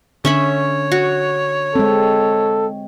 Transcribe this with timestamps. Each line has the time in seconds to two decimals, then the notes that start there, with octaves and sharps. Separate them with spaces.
0.25 D3 C#4 C#5 E5 B5
0.92 F#4
1.75 G#3 C4 A4